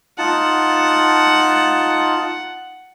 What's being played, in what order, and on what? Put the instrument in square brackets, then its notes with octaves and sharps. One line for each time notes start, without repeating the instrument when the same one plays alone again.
[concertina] D#4 F4 A5 [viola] F#5